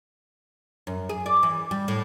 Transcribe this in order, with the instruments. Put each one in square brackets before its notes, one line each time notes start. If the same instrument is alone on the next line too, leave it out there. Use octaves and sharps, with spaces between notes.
[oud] F#2
G#4
D5
E3
G3
A2